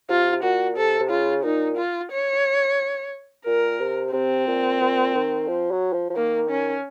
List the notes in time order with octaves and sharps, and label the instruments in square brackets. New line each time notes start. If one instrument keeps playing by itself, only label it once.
[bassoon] C3 [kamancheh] F4
[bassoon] A#2 [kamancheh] F#4
[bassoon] C3 [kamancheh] A4
[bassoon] C3
[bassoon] C#3 [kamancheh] F4
[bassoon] A#2 [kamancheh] D#4
[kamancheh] F4
C#5
[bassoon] A#2 [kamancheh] A#4
[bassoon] C3
[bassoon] C3 [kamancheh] C4
[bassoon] A#2
A#2
D#3
F3
F#3
F3
F3
[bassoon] D#3 [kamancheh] A#3
[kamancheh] C#4